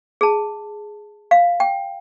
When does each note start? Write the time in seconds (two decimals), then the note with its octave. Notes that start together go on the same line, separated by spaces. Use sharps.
0.21 G#4 A5
1.31 F5
1.60 G5